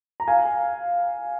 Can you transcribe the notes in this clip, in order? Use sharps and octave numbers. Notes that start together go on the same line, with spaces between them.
A#5
F5 G#5